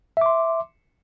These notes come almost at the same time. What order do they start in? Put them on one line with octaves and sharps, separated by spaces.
E5 D6 C6